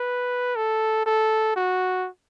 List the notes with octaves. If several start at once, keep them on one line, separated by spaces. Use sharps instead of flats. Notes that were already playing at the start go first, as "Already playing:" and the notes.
Already playing: B4
A4
A4
F#4